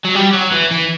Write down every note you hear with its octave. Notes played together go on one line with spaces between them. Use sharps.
F#3
G3
F#3
E3
E3